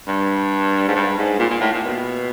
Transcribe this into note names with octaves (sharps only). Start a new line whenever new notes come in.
G2
G#2
G2
G#2
A#2
A#2
A2
A#2
B2